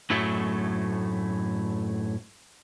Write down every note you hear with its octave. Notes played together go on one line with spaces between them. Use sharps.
F#2 A2 F#3 A3